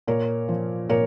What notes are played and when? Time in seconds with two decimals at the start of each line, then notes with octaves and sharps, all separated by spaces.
0.07 A#2 A#4 C#5
0.49 F3
0.89 A#2 A#4 C#5